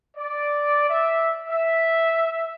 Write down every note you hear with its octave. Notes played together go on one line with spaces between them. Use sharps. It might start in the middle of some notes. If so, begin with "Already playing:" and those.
D5
E5
E5